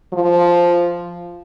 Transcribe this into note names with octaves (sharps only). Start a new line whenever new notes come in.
F3